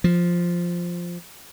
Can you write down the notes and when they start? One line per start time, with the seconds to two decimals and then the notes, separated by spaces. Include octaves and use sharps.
0.04 F3